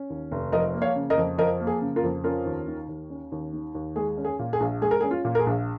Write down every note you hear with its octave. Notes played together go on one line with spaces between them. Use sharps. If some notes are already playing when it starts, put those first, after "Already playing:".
Already playing: C#4
D#2
F1
F3 A#4 D#5
A#3
C#5 F5
C#3
A#4 D#5
F2
F3 A#4 D#5
A#3
G#4
C#3
F4 A#4
F2
C#4 F4 A#4
D#2
D#3
D#2
C#4
D#2
D#3
D#2
G#3 G#4
C#4
G#4
A#2
G#4
A#1
G#3 G#4
A#4
C#4 G#4
F4
A#2
A#4
G#4
A#1